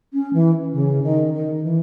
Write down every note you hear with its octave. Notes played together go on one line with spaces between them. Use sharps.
C#4
E3
C#3
D#3
D#3
E3